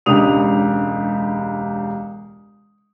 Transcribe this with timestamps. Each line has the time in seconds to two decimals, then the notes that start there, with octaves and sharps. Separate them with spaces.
0.06 E1 C#2 D4 G4 D#6 F7